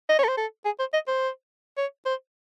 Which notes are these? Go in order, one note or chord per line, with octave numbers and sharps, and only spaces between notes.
D#5
C#5
A4
C5
A4
G#4
C5
D#5
C5
C#5
C5